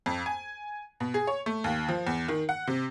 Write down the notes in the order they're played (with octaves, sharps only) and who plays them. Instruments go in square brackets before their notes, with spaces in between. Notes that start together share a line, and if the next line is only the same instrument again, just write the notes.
[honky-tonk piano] F2
G#5
B2
G#4
C#5
A3
D#2
F3
E2
D#3
F#5
C3